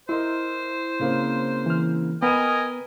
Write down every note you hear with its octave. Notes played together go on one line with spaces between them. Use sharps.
E4 A#4 C5 D#5 C6
C#3 A#3 C4
E3 F6
B3 A#4 B4 D#5 G5 G#5 D#7